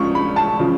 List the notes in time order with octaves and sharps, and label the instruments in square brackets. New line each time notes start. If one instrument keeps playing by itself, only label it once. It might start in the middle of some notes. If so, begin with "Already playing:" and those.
Already playing: [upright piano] C#2 C#3 F3 C#6
B5
A5
C#3 F3